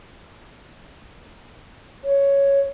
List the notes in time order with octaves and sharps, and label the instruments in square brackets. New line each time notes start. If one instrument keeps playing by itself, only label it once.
[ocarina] C#5